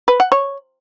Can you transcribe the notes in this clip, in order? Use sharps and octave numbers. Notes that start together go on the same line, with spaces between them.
B4
F#5
C#5